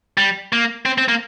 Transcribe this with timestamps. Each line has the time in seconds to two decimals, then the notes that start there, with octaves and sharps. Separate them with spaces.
0.18 G3
0.53 A#3
0.86 C4
0.98 C4
1.08 A#3